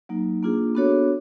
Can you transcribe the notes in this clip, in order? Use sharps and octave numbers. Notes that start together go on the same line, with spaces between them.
F#3 A#3 D#4
A#3 D4 F4 G#4
B3 D4 F#4 A4 C#5